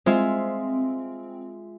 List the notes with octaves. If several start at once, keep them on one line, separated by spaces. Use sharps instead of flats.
G#3 C4 F4 E5